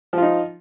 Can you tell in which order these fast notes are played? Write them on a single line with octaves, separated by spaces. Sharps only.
F3 F4 D#4